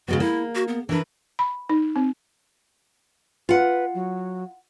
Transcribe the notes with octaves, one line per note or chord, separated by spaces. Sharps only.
C#3 G#3 B3 F#4
A#3 E4
F#4
B3
E3 D4 A#4 B4
B5
D#4
C4
F4 B4 F#5
F#3